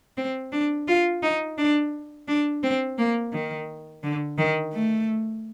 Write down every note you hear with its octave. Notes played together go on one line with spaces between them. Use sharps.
C4
D4
F4
D#4
D4
D4
C4
A#3
D#3
D3
D#3
A3